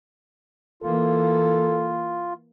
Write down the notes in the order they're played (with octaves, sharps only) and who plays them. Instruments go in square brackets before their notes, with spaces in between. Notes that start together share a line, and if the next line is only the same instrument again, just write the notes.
[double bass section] E3 A#3 [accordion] F4 [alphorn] A4